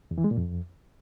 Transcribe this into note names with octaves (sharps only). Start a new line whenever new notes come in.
E2
E3
G#3
A#2
F2